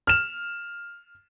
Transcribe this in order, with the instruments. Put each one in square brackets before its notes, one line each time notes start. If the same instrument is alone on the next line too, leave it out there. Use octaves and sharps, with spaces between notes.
[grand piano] F6 E7